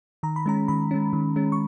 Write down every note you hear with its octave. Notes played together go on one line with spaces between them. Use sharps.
D#3 A#5
B5
G#3 C#4 A#5
D#3 B5
G#3 C#4
D#3
G#3 C#4
C#6